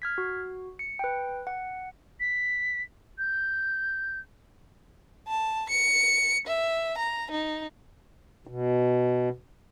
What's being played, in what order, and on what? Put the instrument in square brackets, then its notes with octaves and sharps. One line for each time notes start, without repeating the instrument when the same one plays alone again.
[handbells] F6 G#6 B6
F#4
C#7
B4 G5
F#5
[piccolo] B6
G6
[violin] A5
C#7
E5
A#5
D#4
[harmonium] B2